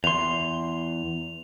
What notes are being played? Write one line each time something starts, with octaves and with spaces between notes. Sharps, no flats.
E2 C6 F7